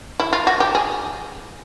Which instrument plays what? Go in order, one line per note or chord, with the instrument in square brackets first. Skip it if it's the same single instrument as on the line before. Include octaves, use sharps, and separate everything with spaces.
[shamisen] E4
F4
F#4
G4
G#4